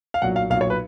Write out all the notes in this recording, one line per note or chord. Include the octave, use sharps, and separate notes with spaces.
F5
B1 A#2 F#3 F#5
F5
B1 A#2 F#3 F5
C#5
B4